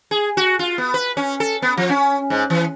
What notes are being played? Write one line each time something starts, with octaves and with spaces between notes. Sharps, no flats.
G#4
F#4
F4
B3
B4
C#4
A4
B3
F3
C#4
G#2
E3